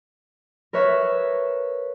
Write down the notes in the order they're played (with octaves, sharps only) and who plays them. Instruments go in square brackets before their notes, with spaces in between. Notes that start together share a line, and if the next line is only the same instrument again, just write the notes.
[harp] A#4 B4 C#5 E5